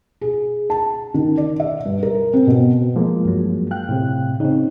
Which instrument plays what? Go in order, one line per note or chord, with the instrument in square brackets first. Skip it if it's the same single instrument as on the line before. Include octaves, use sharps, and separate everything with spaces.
[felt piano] G#4
A5
D#3
D5
E5
G2
A#4
C4
B2
[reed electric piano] F3 G#3 A#3
[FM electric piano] G2 F#3
F5 G5 F#6
[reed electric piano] A2 C3
[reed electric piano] C#3 [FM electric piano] C4 D#4